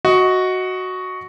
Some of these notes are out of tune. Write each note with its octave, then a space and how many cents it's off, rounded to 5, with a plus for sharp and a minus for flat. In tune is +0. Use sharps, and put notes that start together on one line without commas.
F#4 +0 D#5 +15